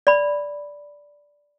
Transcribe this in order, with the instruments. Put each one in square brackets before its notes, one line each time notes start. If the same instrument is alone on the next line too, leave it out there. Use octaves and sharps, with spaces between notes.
[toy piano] D5 B5